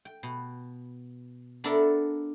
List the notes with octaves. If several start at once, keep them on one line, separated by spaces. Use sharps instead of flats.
G5
B2
B3 D4 A4 A#4 D5 E5